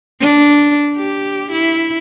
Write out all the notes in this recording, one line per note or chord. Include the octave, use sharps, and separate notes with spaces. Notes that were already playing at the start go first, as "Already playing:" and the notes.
D4
G4
E4